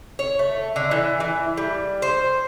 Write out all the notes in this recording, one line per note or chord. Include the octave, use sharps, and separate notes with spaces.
C#5
A3
D3
E3
E3
G3
C5